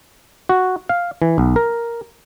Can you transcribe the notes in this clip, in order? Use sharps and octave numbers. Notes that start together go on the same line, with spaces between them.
F#4
F5
E3
B1
A#4